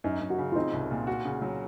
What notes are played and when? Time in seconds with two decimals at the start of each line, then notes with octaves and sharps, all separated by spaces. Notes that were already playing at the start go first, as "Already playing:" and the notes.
0.04 F#2 D#4
0.21 F#2
0.30 F#4
0.38 C#3
0.52 F4
0.56 C4 D#4
0.73 C2
0.91 A#2
1.07 F#4
1.25 C#3
1.42 F#3